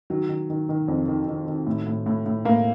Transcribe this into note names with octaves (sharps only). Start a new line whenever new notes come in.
D#3 F#3
D#3
D#3
D#3
F2
D#3
D#3
D#3
A2
A2
A2
A2
A2 A#3